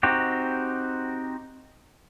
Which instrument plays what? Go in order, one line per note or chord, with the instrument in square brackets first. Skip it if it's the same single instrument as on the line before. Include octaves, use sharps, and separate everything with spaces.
[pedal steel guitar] C4 D#4 F#4 G4